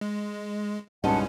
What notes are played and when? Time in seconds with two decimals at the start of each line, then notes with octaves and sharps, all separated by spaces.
0.01 G#3
1.04 C2 G2 A#2 G#3 C#4 D#4 F#5 A5